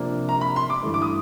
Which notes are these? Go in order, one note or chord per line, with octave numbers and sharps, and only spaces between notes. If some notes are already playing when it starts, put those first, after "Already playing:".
Already playing: C3 F3 A#3 D4
A#5
B5
C6
D6
G2 E3 A3
D6
D#6